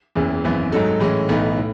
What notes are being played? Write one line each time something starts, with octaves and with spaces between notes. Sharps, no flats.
F#1 E2 C#3 E3
G#1 F#2 E3 B3
G#2 F#3 A3 D#4 A4
A2 E3 G#3 C#4
B1 A2 E3 B3 D#4
A2